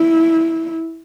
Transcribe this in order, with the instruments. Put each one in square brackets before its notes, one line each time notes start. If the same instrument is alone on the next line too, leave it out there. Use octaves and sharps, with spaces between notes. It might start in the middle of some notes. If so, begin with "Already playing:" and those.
Already playing: [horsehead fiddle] E4